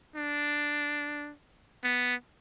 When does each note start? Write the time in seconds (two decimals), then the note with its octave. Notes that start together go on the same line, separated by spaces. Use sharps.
0.16 D4
1.84 B3